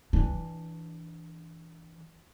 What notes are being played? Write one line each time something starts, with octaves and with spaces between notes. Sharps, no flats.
E3 D4